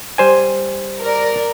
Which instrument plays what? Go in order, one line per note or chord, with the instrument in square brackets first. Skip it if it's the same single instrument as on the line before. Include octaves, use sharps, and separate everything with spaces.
[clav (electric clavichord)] G3 C5 G#5
[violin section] A#4 D5